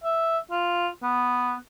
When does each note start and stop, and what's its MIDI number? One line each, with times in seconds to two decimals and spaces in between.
0.04 0.38 76
0.51 0.88 65
1.03 1.54 59